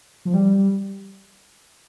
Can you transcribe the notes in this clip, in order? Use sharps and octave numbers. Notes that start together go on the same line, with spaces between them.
F3
G3